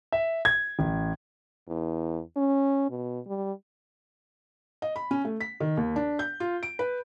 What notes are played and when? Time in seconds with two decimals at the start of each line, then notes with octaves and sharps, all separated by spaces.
0.12 E5
0.45 G#6
0.79 A1
1.68 E2
2.36 C#4
2.90 B2
3.27 G3
4.82 D#5
4.96 B5
5.11 C#4
5.25 A3
5.41 B6
5.60 D#3
5.77 D#2
5.96 D4
6.19 G6
6.40 F4
6.63 D7
6.79 B4